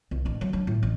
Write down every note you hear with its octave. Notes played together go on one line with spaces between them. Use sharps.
C2
A1 D4
F#3
F#3 D4
A2
A1